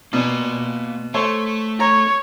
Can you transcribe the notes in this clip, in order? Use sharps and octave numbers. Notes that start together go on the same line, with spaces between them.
B2 A#3 D5
A3 A4 C5 C#5
C#5 A#5